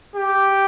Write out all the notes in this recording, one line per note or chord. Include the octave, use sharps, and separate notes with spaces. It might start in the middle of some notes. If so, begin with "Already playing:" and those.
G4